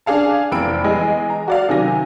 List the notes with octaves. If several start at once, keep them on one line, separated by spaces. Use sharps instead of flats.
D4 G#4 F5 A5
F1 E2 C4 B5 E6 D7
E2 G#3 D#5 G#5
A#5
F#4 D5 F5
C3 D#3 F#3 G#5 A#6